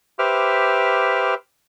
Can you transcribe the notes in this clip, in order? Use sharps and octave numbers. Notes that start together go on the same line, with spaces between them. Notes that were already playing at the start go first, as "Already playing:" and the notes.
G4 B4 C5 E5 D6 F6